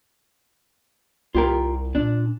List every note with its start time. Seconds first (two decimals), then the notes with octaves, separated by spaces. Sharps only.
1.35 C2 F4 G4 A#4
1.95 A#2 D4